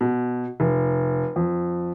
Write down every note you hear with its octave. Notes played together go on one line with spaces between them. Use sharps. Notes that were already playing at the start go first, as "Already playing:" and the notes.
B2
F1
F2